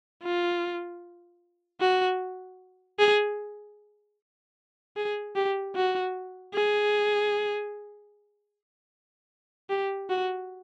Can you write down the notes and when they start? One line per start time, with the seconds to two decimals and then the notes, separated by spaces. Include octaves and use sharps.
0.23 F4
1.80 F#4
2.99 G#4
4.97 G#4
5.36 G4
5.75 F#4
6.55 G#4
9.70 G4
10.10 F#4